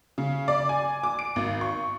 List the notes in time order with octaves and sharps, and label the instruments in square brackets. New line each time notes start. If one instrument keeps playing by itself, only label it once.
[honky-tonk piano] C#3
D5
G#5
D6
D7
G#1
C#6